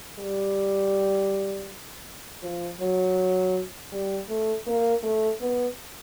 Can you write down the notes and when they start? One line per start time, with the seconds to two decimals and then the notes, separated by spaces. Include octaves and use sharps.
0.19 G3
2.42 F3
2.80 F#3
3.92 G3
4.28 A3
4.67 A#3
5.03 A3
5.41 B3